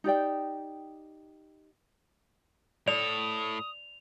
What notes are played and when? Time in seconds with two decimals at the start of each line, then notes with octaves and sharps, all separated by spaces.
0.04 D#4 G4 D5 G5
2.88 A2 A4 D5 D#6 F7